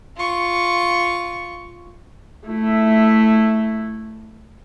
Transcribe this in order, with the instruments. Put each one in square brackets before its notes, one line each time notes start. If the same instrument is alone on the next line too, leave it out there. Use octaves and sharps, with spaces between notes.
[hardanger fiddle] F4 C#6
[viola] A3 E4